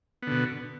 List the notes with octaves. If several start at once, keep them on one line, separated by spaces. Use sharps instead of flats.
B2 D3 B3